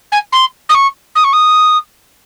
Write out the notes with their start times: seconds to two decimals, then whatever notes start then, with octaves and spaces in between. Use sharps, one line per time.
0.11 G#5
0.32 C6
0.69 D#6
0.74 C#6
1.15 D#6
1.23 C#6
1.32 D#6